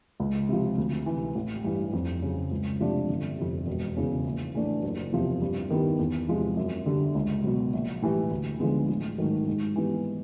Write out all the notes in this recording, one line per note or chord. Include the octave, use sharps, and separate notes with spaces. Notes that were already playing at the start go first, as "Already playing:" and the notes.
C#2
C3 F3
D2
C3 E3
A1
G2 E3 G3
F2
C#3 F#3
C#2
C3 F3 A3 D4
G1
F2 C3
E1
E2 C#3
A#1
A2 E3 A3 D4
F#1
E2 C3 F3
G2
D#3 G3 B3 E4
E2
C3 F3 G#3
F#2
D3 G3
C#2
B2 F#3
A#1
A2 E3 G3
D2
D3 F3 G#3 B3
A1
G#2 D#3 F#3 A3
G#2
E3 G3 B3